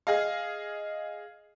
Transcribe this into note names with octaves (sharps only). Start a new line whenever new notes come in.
G#4 D#5 F5